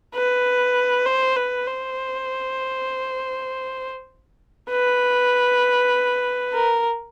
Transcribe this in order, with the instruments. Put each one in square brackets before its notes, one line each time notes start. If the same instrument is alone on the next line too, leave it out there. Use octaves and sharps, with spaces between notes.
[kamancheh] B4
C5
B4
C5
B4
A#4